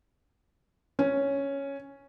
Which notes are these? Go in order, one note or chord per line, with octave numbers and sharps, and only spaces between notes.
C#4